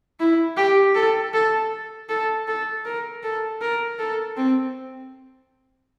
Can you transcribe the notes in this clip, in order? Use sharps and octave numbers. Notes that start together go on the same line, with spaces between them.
E4
G4
A4
A4
A4
A4
A#4
A4
A#4
A4
C4